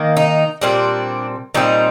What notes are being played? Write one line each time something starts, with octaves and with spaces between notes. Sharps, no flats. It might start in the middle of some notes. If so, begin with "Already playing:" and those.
Already playing: D#3 A#3
D#4
A#2 G3 C4 D4
A#2 G3 C4 D#4